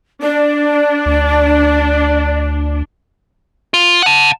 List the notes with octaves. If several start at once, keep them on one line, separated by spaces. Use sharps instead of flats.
D4 D5
D2
F4
F#5 A5